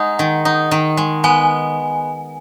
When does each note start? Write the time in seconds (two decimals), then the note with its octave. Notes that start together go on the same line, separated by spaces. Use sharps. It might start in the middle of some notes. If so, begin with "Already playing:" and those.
Already playing: G#3 D#4 F#5
0.19 D#3
0.45 D#4
0.71 D#3
0.97 G#3
1.24 B3 G#5